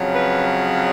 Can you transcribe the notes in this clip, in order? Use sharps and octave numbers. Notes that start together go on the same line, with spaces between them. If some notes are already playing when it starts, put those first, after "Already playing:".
Already playing: F2 C#3 F#3
B4